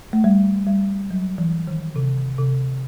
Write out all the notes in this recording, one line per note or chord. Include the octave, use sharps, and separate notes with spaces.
A3
G3
G3
F#3
E3
D#3
C3
C3